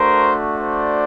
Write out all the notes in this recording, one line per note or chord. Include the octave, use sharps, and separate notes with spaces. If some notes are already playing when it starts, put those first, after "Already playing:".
Already playing: A3 D4 F#4 A#4 C5
C5 D5